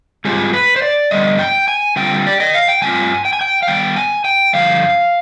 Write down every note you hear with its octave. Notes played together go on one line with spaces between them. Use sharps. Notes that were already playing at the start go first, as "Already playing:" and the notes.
G#2 G3 C4 F4 G#4
B4
C5
D5
G2 D3 G3 B3 D#5
G5
G#5
D3 G3 C4 F4 G5
D5
D#5
F5
G5
G2 D#3 G3 C4 F4 G#5
G5
G#5
G5
F5
D#3 G3 B3 G5
G#5
G5
G2 D3 F3 F5